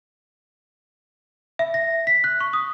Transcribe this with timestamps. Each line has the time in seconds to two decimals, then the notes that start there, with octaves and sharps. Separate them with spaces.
1.59 E5
1.74 A#6
2.07 B6
2.24 F#6
2.41 C#6
2.53 D#6